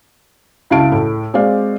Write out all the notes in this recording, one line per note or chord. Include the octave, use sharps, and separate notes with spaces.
C#2 E4 F#4 F5 A5 D7
A2
G#3 C4 F#4 D5 F5